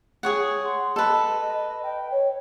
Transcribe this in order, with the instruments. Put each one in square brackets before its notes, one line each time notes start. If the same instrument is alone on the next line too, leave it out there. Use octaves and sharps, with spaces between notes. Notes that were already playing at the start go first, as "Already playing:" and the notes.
[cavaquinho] G#4 C#5 F#5
[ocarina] C6
[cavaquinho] A4 B4 [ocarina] D#5
[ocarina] G5
C#5